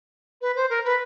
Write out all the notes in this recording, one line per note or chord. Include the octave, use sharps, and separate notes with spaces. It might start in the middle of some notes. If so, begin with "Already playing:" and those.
B4
C5
A#4
B4